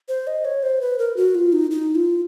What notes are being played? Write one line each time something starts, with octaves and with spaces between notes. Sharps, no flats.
C5
D#5
C#5
C5
B4
A#4
F#4
F4
D#4
D#4
F4